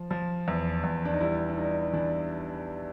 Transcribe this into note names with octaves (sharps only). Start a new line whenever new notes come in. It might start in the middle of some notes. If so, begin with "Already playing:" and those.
Already playing: F3
F3
E2
E2
D4
D#4
G3 E4
D4
G3 D#4
E3 D4